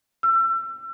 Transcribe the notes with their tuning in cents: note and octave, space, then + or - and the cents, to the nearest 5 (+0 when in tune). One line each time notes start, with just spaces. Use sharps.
E6 +35